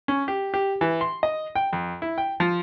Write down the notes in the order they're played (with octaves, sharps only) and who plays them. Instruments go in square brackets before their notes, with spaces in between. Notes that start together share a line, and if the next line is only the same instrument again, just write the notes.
[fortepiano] C#4
G4
G4
E3
C6
D#5
G5
F2
E4
G5
F3